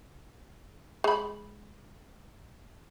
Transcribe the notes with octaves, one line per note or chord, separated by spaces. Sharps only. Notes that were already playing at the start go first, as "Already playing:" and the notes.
G#3 B5